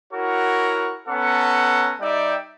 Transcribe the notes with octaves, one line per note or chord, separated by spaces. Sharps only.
E4 F#4 A#4 C#5 F#5 C#6
B3 C#4 A4 F#5 A#5 C#6
G3 D#4 D5 E5 G5